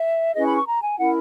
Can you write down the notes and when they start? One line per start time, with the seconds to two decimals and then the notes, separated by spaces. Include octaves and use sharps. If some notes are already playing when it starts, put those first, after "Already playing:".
Already playing: E5
0.35 C#4 E4 G#4 B4 D#5
0.46 B5
0.56 C#6
0.67 A#5
0.82 G#5
0.98 C#4 E4 A#4 F#5